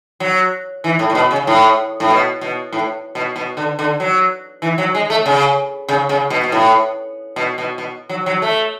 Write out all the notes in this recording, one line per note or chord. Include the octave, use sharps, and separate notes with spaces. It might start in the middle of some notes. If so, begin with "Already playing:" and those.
F#3
E3
A2
A2
B2
C#3
A2
A2
B2
B2
A2
B2
B2
D3
D3
F#3
E3
F#3
G#3
A3
C#3
C#3
C#3
B2
B2
A2
B2
B2
B2
F#3
F#3
A3